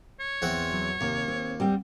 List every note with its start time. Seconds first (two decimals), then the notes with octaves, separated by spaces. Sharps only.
0.20 C#5
0.42 E2 C4 F#5
0.71 F#3
1.01 D#2 C3
1.28 C4
1.60 G3 C4 G5